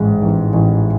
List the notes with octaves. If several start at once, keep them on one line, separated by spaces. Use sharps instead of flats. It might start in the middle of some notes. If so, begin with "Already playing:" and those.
Already playing: A1 G#2 G#3
A1
A1